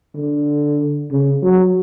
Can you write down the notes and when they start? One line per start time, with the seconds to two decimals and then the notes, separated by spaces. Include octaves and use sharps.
0.15 D3
1.12 C#3
1.42 F#3